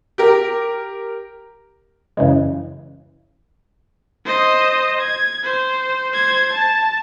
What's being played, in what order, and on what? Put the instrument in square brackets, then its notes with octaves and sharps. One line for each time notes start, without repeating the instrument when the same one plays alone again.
[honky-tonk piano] G4 A#4
[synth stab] F#2 C#3 E3 G#3
[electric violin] C5 D#5
G#6
C5
C5 G#6
A5